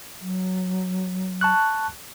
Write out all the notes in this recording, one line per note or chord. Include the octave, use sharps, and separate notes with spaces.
F#3
A5 C#6 F#6